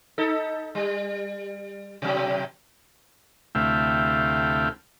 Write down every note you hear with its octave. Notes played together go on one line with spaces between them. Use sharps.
D#4 A4
G3
B2 F#3
D2 C3 A3 E4 F5 G5